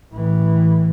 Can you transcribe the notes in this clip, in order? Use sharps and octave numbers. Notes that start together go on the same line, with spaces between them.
A1 E3